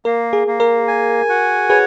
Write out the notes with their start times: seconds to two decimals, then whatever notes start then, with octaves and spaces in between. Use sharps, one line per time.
0.05 A#3 A#4
0.33 G#4
0.47 A#3
0.60 A#4
0.88 G#5
1.29 F#4
1.70 G#4 B4 C#5